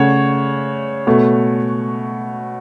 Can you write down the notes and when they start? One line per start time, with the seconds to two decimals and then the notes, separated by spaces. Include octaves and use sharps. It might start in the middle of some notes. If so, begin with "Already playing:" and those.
Already playing: C#3 A3 C#5 F#5
1.07 B2 A3